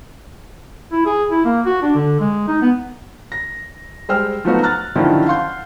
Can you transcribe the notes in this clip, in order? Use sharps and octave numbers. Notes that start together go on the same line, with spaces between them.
E4
G#4
E4
A#3
F#4
D4
D3
G#3
D#4
B3
A#6
G3 G#3 C5 G5 E6 F6
F3 F#3 A3 B3 D#4 F#4
A#5 F6 F#6 A6
D3 D#3 F3 F#3 C#4 E4
F5 F#5 C6 G6